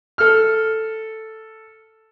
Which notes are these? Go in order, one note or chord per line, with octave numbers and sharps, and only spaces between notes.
A4 F6